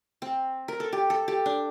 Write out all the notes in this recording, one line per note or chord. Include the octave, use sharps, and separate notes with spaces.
C4
A#4
A4
G4
A4
G4
D4